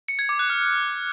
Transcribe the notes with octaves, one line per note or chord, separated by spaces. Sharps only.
C#7
G#6
D6
F#6
F6